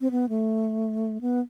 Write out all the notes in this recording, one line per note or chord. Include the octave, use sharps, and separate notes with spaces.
C4
B3
A3
B3